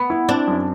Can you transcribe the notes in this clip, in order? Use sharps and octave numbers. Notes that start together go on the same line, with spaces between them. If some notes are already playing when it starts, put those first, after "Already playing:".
Already playing: B3
E4
C4 D4
F#2